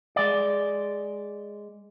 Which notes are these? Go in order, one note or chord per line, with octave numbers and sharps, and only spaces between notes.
G#3 D5